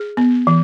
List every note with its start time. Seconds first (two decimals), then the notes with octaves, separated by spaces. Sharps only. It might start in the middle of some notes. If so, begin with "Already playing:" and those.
Already playing: G#4
0.17 B3
0.47 E3